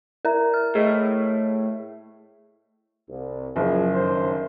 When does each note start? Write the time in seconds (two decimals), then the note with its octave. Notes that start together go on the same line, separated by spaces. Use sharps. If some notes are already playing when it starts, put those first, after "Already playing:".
0.25 E4 A#4 E5 A#5
0.54 F6
0.75 A2 G#4 D#5
3.09 C2
3.56 F#1 F3 G#4
3.95 G1 F#2 D#3 C5